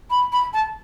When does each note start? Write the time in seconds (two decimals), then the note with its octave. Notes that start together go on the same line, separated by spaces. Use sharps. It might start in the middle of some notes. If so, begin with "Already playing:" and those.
0.10 B5
0.32 B5
0.53 A5